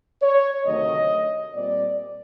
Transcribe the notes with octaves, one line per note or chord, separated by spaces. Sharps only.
C#5
D2 C3 D#3 F#3 A3 D#5
A#2 G3 C4 D5